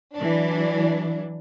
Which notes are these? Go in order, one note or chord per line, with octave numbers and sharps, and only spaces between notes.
E3 F#3 D4